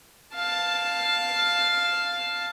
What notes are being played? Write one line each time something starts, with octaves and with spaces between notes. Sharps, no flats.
F5 A5